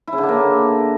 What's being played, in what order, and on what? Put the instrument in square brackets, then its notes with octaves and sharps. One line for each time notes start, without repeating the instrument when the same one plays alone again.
[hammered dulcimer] E4
C#3
D3
D4
A#3